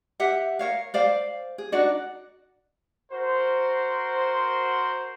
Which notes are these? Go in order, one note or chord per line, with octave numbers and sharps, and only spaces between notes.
G4 E5 F#5
A#4 C#5 F5
C5 D5 F5
G#4
D4 D#4 F#4 D5
F#4 A#4 C5